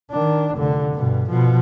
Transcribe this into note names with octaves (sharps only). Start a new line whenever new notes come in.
D#3 D4
F1 D3
G2 B2
B2 F3